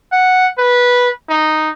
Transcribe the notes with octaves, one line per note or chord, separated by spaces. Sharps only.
F#5
B4
D#4